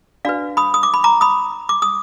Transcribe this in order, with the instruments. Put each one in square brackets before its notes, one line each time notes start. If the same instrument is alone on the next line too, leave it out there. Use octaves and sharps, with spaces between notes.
[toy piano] D4 F#4 B4 D5 F5
B5 D#6
D#6
D6
B5
A#5 D6
B5 D#6
D6
D#6